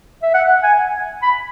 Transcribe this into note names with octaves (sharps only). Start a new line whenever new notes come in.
E5
F#5
G#5
B5